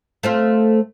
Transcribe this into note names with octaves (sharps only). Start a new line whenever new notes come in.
A3 C4 F4